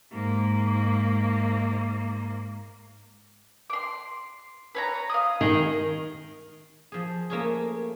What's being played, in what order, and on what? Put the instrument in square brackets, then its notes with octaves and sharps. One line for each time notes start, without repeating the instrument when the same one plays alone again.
[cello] G#2 A#3
[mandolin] C6 D6
B4 C#5 A#5
F5 D#6
[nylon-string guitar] D#3 [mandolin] G#4 D#5
[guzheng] F3 G#4
A3 A#3 C#4 G#4